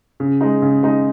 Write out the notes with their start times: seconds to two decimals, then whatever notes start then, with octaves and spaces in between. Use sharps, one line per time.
0.20 C#3
0.41 G#3 D#4
0.62 C#3
0.83 G#3 D#4